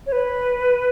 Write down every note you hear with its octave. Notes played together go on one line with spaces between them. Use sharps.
C#5
B4